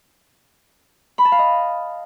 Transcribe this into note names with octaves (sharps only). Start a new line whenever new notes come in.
B5
A5
F5
D#5